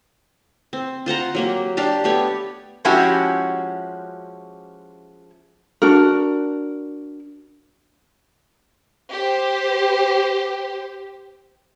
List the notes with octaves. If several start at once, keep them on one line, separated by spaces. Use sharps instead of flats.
C4
F4 C5 F#5 A#5
F#3 A#3 G4
D4 G4 F5 A5
A3 B3 G4 C#5
F3 G#3 C#4 E4 F#4 G4
D4 F#4 A#4
G4 C5